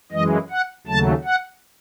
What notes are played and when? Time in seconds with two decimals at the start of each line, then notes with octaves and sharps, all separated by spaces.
0.12 F#2 E3 G#3 D#5
0.50 F#5
0.87 D#2 C#3 F#3 A3 A5
1.24 F#5